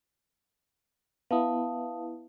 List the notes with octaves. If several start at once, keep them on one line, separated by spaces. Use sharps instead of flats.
B3 E4 F5 A5 D#6